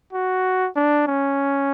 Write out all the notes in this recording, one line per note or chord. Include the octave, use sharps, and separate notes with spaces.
F#4
D4
C#4